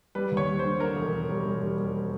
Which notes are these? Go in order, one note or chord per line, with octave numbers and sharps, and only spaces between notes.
G3 B4
D#2
C#5
G3
C5
D3
D3 A#4
E1
E1
G3
E1
G3
G3